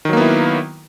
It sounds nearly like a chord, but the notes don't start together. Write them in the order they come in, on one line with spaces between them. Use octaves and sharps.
D#3 F#3 A#3 B3 E4